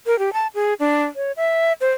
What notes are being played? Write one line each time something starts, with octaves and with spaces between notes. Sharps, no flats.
A#4
G4
A5
G#4
D4
C#5
E5
C5